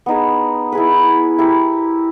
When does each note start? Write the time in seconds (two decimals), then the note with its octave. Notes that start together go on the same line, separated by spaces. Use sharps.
0.06 B3 D#4 G#4
0.72 E4 G#4 B4
1.38 E4 G4 A#4